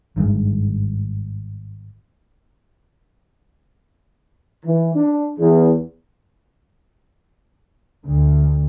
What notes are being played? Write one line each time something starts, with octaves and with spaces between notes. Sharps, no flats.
G#1 G2 B2 G#3
E3
D4
E2
D2